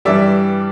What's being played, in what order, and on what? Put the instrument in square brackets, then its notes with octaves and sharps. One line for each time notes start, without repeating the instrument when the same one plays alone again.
[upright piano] G2 E3 G3 D5 E5